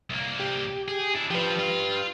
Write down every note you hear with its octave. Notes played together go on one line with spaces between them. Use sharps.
C2 A#3
G4
G#4
D4 E4
F3 G4 B4
F4